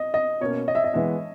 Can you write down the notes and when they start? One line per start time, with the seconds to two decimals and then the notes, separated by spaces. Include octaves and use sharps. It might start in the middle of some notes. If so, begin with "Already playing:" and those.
Already playing: D#5
0.14 D#5
0.41 B2 A#3 C#4 C#5
0.68 D#5
0.75 E5
0.84 D#5
0.94 E3 G#3 B3 E5